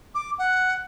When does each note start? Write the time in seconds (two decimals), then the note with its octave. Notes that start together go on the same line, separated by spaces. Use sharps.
0.15 D6
0.39 F#5